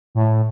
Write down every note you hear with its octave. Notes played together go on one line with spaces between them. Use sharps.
A2